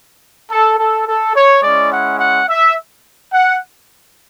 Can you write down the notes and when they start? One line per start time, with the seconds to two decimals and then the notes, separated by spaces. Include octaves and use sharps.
0.50 A4
0.78 A4
1.07 A4
1.35 C#5
1.63 G#3 C#4 E4 D5
1.92 F#5
2.20 F#5
2.48 E5
3.33 F#5